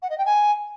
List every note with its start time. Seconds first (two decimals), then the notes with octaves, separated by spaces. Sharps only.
0.02 F#5
0.10 D#5
0.18 G5
0.25 G#5